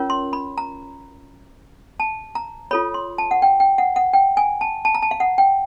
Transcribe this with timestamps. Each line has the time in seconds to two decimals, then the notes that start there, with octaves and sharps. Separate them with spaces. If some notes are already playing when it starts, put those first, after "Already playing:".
Already playing: C#4 F4 A#4 C#5
0.10 C6
0.33 B5
0.58 A#5
2.00 A5
2.35 A#5
2.71 F4 A4 C#5 B5
2.94 C6
3.18 A5
3.31 F#5
3.42 G5
3.60 G5
3.78 F#5
3.96 F#5
4.13 G5
4.37 G#5
4.61 A5
4.85 A5
4.95 A#5
5.02 A5
5.11 F5
5.20 F#5
5.38 G5